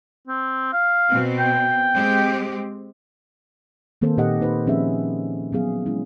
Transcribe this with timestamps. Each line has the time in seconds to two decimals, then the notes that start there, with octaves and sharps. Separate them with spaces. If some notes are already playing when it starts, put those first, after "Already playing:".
0.27 C4
0.73 F5
1.08 B2 C4
1.39 G5
1.95 G#3 C4 G4
4.02 D#3 A#3 C4 A4 C5
4.17 A#2 D#4 G4 D#5 F#5
4.41 D#4 B4 C5
4.67 F3 C4 C#4 G4 G#4 E5
5.53 F#3 B3 G#4 F5
5.86 G#3 C#4 E4